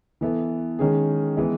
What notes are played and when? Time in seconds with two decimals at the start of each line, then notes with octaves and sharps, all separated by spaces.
0.21 E3 B3 E4 A4
0.79 D#3 G#3 C#4 G#4
1.37 E3 G#3 B3 E4